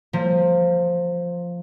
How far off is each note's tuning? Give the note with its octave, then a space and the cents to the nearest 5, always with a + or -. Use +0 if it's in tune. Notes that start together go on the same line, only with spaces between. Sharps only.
F3 +0 A#3 -40